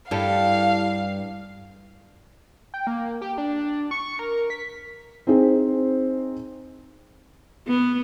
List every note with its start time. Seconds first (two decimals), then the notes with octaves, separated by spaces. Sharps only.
0.11 G2 E4 G4 A4 F5
2.74 G5
2.87 A#3
3.22 G4
3.38 D4
3.91 C#6
4.19 A#4
4.50 B6
5.27 C4 D#4 G#4 C5
7.68 B3